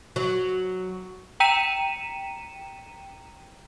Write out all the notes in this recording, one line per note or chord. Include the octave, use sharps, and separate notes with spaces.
F#3
G5 A#5 B6 C#7 D#7 E7